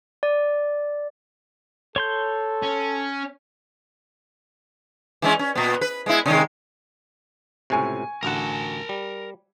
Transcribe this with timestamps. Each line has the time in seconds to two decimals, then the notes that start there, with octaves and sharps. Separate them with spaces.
0.23 D5
1.96 A4 C#5 C6 G6
2.62 C#4
5.22 E3 G#3 C#4
5.39 C#4
5.55 A#2 B3
5.81 B4
6.06 G#3 B3 E4
6.26 C3 D#3 G#3
7.70 C#2 A2 C3 G#5 C#6
8.23 A1 D2 A#4 F#5 A5
8.89 G3